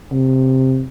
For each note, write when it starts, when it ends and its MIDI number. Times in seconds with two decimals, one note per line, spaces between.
0.12 0.84 48